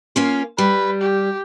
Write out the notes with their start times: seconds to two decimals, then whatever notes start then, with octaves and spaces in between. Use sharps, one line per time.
0.16 A#3 C#4 F4
0.58 G3 B4
1.01 G4